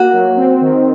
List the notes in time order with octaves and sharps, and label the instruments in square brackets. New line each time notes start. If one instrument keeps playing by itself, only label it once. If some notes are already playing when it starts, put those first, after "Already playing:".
Already playing: [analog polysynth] A#3 [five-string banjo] F#4
[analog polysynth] F#3
C4
D#3